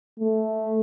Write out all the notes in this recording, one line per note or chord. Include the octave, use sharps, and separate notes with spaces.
A3